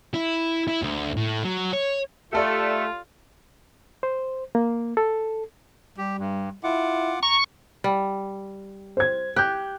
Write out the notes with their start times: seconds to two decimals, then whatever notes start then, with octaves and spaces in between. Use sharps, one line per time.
0.14 E4
0.68 E4
0.82 D2
1.17 A2
1.44 F#3
1.73 C#5
2.33 A3 F4 G4 A4 D5
4.03 C5
4.55 A#3
4.97 A4
5.98 G3 G4
6.19 G2
6.64 E4 F4 F#5 D6
7.23 A#5 C#6
7.84 G3
8.97 C5 G#6
9.36 G4 F#6 G6